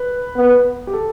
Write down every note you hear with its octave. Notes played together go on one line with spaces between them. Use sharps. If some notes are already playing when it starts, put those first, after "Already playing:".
Already playing: B4
B3
G4
A4